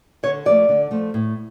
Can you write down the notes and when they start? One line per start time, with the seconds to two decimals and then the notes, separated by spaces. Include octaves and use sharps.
0.23 D3 C#5
0.46 F3 A3 D5
0.69 D3
0.91 F3 A3
1.14 A2